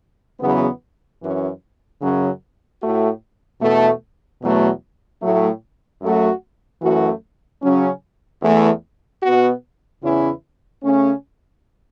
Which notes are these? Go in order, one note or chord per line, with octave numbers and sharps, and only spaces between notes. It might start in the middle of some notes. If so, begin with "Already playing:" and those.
E2 C#3 F#3 B3
F#2 E3 C#4
F#2 C#3 F#3 C#4
A2 A3 F#4
E2 B2 A3
E2 B2 F#3 A3
A2 F#3 A3
F#2 F#3 A3 F#4
F#2 E3 A3 F#4
C#3 F#3 C#4
E2 E3 A3
B2 B3 F#4
E2 C#3 E3 C#4 E4
C#3 A3 C#4